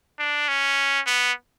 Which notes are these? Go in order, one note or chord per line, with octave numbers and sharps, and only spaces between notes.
D4
C#4
B3